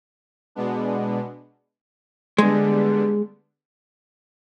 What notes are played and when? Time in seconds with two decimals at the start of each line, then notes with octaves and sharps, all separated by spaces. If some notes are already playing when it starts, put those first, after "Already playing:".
0.55 B2 G#3 B3 D4
2.38 D3 G3 G#3 B3 D4